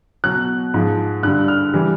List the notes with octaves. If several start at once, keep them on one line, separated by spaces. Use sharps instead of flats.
B2 F#3 F#6
G#2 F3 G#3
G2 D3 G3 F#6
F6
E3 G3